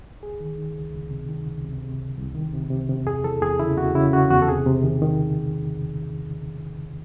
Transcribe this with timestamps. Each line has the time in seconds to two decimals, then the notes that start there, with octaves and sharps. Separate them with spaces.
0.22 C#2 G#4
0.40 D#3
0.58 D#3
0.76 C#2
0.94 C#2
1.11 C3
1.29 D#3
1.47 C#2
1.64 C3
1.82 C3
1.99 C2
2.17 C2
2.35 D#3
2.53 C3
2.70 C3
2.89 C3
3.06 E2 G#4
3.24 E3 A4
3.42 E2 G#4
3.60 C#3 E4
3.77 E2 F#4
3.95 C#3 E4
4.13 C#3 F#4
4.30 E2 F#4
4.42 A4
4.48 C3 G#4
4.66 C3
4.83 D#3
5.02 D#3